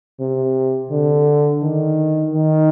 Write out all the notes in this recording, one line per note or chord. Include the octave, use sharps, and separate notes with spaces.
C3
D3
D#3
D#3